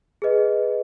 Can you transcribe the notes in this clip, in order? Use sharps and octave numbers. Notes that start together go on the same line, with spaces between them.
G#4 B4 D#5